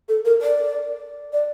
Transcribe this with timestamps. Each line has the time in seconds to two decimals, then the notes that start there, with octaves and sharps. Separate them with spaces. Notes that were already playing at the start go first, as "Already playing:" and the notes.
0.09 A4
0.25 A#4
0.41 D5
1.33 D5